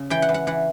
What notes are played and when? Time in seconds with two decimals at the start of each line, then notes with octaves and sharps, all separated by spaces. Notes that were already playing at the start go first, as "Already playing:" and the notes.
Already playing: C#3
0.10 E3 G5
0.22 F#5
0.29 E3
0.34 F#5
0.47 E3 F#5